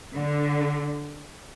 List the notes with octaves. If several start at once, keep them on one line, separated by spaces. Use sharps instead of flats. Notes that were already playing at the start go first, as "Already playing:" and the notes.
D3